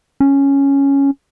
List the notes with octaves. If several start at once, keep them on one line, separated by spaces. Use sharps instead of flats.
C#4